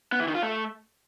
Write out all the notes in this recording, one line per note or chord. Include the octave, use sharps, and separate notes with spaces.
B3
E3
D#3
F4
A3